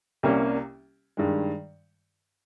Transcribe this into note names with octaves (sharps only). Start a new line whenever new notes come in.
C2 C3 G3 A#3 C#4
G2 D#3 G#3